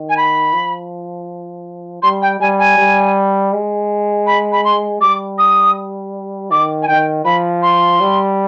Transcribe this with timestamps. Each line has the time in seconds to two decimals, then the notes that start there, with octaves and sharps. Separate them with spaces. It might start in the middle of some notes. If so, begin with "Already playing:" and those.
Already playing: D#3
0.10 G#5
0.17 B5
0.53 F3
2.03 G3 C6
2.22 G5
2.40 G3 G#5
2.59 G#5
2.78 G3
3.53 G#3
4.27 B5
4.52 B5
4.65 C6
5.01 G3 D6
5.38 D#6
6.51 D#3 D6
6.82 G#5
6.88 D#3 G5
7.25 F3 B5
7.62 C6
8.01 G3